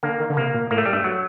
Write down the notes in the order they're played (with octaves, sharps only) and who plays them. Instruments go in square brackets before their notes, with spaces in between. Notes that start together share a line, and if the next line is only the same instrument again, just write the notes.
[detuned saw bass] D3 [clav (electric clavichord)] A#3
[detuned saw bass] D#3
D3
[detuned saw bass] C3 [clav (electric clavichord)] A#3
[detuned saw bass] A#2
[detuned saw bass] A2 [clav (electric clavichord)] A#3
[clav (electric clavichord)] A3
G3
[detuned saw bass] G2 [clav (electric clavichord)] A3
[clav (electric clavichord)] F#3